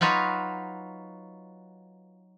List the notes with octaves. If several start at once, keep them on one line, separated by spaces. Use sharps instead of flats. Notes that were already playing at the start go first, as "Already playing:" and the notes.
F#3 D#4 F4 F#4 B4